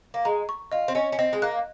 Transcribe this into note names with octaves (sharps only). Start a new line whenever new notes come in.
A#3
G#3 A#5
C#6
F4 D#5
C4
C#4 D#5
C#4
C4 D#5
G#3
A#3 F#6